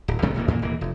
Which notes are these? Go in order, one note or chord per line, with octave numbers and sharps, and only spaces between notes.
D1
C2 C3 D#3 A3
E1 A1 D#3 A#3
E2 A#2 G#3 A#3
D#1 E3 A#3
F1